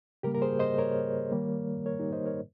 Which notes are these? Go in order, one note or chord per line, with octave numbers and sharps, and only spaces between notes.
C#3 G3 A#3 G4 A#4
A#4
G#4 C5
C5 D#5
A#4 C#5
D#3 G3 A#3
A#4 C#5
D#4 G4
C5 D#5
A#4 C#5